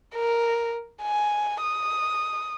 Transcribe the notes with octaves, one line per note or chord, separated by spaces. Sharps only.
A#4
G#5
D#6